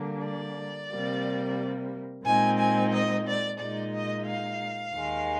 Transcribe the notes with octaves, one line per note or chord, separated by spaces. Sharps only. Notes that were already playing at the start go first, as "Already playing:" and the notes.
Already playing: D3 G3 A#3 D4
D5
C3 G3 A#3
A#2 G#3 C4 D#4 G#5
G#5
D#5
D5
A#2 G#3 D#4 D5
D#5
F5
D#2 D#3 G#3